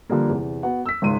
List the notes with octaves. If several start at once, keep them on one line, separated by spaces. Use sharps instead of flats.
D3 F3 G3 A#3
E2 C3
B3 F#4 F#5
E6 B6
G#1 C#2 C6 D#7